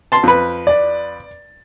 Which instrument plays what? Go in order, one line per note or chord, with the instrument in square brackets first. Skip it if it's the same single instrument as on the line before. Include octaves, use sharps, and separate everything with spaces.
[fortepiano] A5 C6
F2 B4
[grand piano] D5